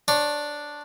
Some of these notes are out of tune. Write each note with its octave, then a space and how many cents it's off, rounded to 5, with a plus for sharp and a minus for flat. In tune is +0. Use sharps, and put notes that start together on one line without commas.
D4 +0 C#5 -20